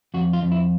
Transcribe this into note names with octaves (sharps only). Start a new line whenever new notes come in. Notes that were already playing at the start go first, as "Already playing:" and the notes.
F2 F#4
F4
F2
E4